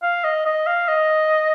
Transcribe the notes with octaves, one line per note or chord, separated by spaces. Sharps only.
F5
D#5
D#5
F5
D#5